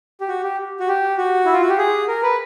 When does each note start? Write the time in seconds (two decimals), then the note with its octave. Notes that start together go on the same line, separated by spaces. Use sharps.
0.21 G4
0.28 F#4
0.43 G4
0.80 F#4
0.88 G4
1.18 F#4
1.45 E4
1.53 F4
1.62 F#4
1.69 G4
1.78 G#4
2.08 A#4
2.23 B4